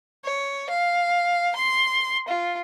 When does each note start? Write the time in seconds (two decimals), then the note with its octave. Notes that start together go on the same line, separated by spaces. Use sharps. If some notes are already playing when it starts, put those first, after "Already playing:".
0.25 C#5
0.70 F5
1.56 C6
2.28 F4